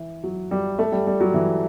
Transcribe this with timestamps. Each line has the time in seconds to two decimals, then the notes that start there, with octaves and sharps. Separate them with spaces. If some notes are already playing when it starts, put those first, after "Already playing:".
Already playing: E3
0.24 F#3
0.51 G3
0.79 A3
0.92 G3
1.07 G3
1.21 F#3
1.34 E3